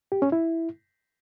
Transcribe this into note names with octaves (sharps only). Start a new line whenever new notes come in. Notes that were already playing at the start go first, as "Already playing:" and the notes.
G4
C#4
E4